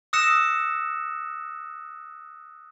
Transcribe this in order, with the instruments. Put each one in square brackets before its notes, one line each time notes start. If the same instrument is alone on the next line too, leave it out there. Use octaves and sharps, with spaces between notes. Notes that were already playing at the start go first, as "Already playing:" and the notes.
[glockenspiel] D#6 E6 F#6 A#6 C#7 E7